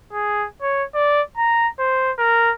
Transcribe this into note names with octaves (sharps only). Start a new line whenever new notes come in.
G#4
C#5
D5
A#5
C5
A#4